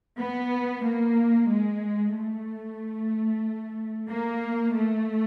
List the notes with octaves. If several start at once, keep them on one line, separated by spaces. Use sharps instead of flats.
B3
A#3
G#3
A3
A#3
A3